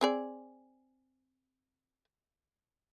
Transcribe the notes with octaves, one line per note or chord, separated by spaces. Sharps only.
C4 G#4 D5